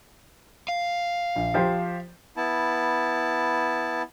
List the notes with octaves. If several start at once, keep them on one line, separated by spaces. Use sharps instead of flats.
F5
A#1
F3 G4 C5
B3 E4 A5